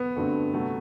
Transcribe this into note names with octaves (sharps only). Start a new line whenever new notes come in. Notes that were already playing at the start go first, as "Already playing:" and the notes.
Already playing: B3
G2 D3 A3 C4 F#4
C3 F#3 A3